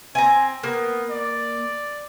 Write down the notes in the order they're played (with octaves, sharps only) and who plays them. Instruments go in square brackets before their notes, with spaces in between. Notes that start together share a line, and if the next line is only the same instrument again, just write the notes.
[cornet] C4 [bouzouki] G#5 A#5
[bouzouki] A#3 [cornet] B3
[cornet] D5